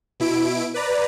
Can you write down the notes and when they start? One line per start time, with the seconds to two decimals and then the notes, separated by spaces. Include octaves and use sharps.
0.20 B2 E4 D7
0.74 B4 D5 A#5